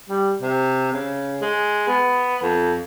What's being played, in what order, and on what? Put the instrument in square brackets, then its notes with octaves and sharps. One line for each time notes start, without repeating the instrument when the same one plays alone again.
[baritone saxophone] G3
C3
C#3
G#3
B3
F2